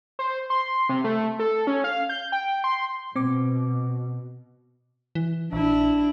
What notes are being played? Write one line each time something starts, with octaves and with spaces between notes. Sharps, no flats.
C5
C6
C3
A3
A4
C#4
F5
G6
G5
C6
B2 C4 D6
E3
A#1 D4 E4